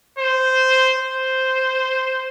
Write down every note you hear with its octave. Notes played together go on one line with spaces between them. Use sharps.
C5
C5